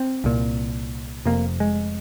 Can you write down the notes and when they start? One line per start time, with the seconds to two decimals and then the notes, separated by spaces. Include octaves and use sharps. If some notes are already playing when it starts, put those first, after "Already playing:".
Already playing: C4
0.24 C2 A#2
1.25 F1 F2 C3 A#3
1.60 G#3